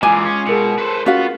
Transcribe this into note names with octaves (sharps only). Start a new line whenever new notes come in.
A#2 E3 G#3 F4 G#5 D6
C#4
B2 G#4 A#4 C#7
A4 B4 C5
B3 C#4 F4 F#4 F5